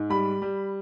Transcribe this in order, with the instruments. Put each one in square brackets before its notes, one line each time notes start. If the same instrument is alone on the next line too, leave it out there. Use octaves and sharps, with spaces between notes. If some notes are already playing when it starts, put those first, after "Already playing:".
Already playing: [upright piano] G#2
G3 B5
G3